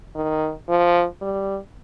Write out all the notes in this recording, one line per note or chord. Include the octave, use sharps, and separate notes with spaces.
D#3
F3
G3